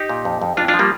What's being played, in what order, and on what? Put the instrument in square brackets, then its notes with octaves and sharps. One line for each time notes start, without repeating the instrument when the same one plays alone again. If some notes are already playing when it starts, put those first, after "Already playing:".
Already playing: [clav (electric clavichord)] D#4 G4
A#2
F2
F2
F2 D4 F4
D4 F4
F3
G3 A#3